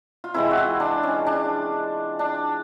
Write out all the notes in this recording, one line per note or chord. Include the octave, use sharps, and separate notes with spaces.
F4
C3 E3 G#3 C4 E4
F#4
F4
D4
C#4
D4
D4